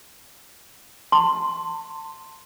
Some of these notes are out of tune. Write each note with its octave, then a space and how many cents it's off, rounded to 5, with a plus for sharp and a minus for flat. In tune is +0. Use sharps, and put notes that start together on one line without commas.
A5 +30 C6 +0